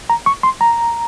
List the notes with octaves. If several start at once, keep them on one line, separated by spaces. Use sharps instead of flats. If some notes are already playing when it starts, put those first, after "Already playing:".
A#5
C#6
C6
A#5